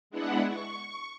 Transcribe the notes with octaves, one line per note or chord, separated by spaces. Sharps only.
G#3 B3 D4 E4 F#5
C#6